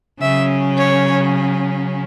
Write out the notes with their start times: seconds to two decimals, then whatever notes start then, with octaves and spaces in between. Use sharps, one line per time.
0.21 C#3 F#3 C#4 E5
0.78 C#5